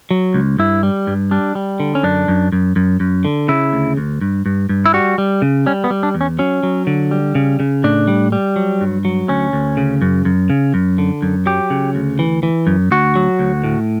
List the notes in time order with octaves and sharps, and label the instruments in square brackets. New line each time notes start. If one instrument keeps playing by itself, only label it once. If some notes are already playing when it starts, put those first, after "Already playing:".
[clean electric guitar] F#3
C#2
G2 E4
G3
G2
G3 D4
G3
D3
C#4
F#2 D4
F#2
F#2
F#2
F#2
D3
C#3 E4
D2
D2
G2
G2
G2
E4
G3 F#4
G3
C#3
G3 C#4
B3
G3
D4
E2
C#4
F#3 C#4
F#3
D3
G3
C#3
C#3
A2 D4
G3
G3
F#3
G2
F#3
D2 C#4
D2
C#3
F#2
F#2
C#3
F#2
D3
F#2
F#3 G4
C#3
D2
E3
E3
F#2
D2 F#4
F#3
D2
A2